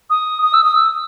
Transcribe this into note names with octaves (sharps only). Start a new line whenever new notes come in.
D#6
D#6
E6
D#6
E6